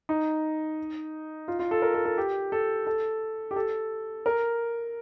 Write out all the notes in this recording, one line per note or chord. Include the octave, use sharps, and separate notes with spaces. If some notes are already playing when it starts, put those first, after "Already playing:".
D#4
F4
F4
A4
A#4
A4
A4
G4
A4
A4
G4
A4
A#4